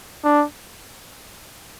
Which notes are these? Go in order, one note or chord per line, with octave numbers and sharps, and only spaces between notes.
D4